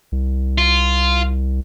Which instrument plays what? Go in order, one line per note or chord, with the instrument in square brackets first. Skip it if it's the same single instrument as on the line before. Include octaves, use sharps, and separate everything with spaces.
[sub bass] C2
[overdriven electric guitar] F4